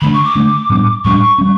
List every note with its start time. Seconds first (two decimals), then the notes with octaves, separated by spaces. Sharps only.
0.01 D3 A3 D4 B5
0.13 C#6
0.24 D6
0.35 D3 A3 D4
0.70 A2 G3 B3 D4
1.04 A2 G3 B3 D4 C#6
1.38 G3 C#4